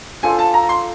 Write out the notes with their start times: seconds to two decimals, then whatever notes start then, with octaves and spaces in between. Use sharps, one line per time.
0.23 D4 F4 A4 C5 G#5
0.39 A5
0.54 A#5
0.69 C6